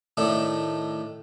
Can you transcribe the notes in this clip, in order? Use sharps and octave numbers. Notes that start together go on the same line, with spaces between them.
A2 D#3 A3 D4